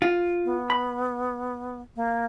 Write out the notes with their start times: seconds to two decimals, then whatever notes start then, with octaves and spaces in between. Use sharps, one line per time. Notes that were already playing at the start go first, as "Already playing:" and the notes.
0.02 F4
0.45 B3
0.70 B5
1.96 A#3